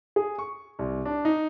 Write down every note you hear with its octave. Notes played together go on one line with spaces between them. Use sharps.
G#4
C#6
C2
D4
D#4